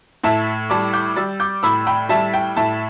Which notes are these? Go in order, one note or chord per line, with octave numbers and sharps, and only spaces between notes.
A2 E5 A5
G3 A5 D6
D6 G6
G3 E6 A6
D6 G6
A2 B5 E6
G5 B5
G3 E5 A5
G5
A2 E5 A5